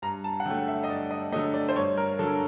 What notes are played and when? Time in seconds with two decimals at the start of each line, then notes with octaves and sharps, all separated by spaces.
0.02 G2 A#5
0.24 A5
0.40 F#5
0.46 D3 F#3 A3 G5
0.68 E5
0.84 D#5
0.89 G2 D5
1.11 D#5
1.32 D3 F#3 A3 D#5
1.54 D5
1.69 C5
1.76 G2 C#5
1.97 A#4
2.19 D3 F#3 A4